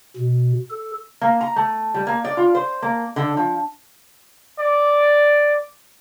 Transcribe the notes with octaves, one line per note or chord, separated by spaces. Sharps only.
B2
A4
A#3
A#5
A3
G3
A#3
D5
F4
C5
A#3
D3
F3
D5